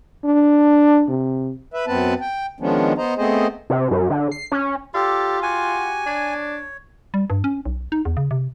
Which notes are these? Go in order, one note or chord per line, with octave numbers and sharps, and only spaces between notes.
D4
C3
B4 E5
F#2 B3 C4 B4 A5
G5
D#3 F3 G#3 B3 C#4 D4
B3 C5 D#5 A#5
A3 B3 C4 G#4 C5 D#5
C3
F#2
D3
C7
C#4
F4 G4 A4 D5
F#4 G4 F#5 G#5
D4 C#5
G3
G2
C#4
B1
D#4
E2
C#3
C3